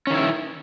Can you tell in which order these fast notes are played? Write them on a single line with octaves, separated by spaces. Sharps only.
C#4 D#3 E4